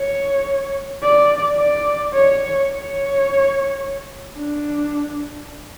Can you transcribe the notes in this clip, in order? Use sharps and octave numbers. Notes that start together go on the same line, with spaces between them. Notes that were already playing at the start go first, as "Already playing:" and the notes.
Already playing: C#5
D5
D5
C#5
C#5
D4